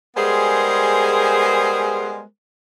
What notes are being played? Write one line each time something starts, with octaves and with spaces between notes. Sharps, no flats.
G3 G#3 B3 G#4 A#4 C5